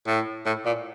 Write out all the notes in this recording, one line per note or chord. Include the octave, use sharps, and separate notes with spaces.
A2
A2
A#2